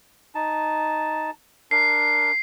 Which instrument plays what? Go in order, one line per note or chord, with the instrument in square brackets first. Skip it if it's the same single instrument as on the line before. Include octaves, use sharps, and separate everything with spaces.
[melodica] D#4 A5
[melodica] D4 A#4 [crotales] C7